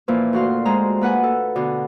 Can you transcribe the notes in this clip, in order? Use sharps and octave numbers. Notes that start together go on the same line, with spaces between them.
A#2 E3 F3 A#3
D2 F#4 F5 C6
G#3 C5 A#5
A#3 B4 F#5 G#5
A4
B2 D3